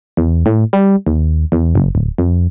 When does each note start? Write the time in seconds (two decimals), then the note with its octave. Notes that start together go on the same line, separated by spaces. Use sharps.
0.17 E2
0.46 A2
0.73 G3
1.07 D#2
1.52 E2
1.75 F#1
1.95 D1
2.18 F2